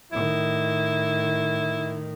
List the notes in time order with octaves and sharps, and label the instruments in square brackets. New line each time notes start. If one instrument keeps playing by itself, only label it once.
[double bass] A2 D#3 [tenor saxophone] E4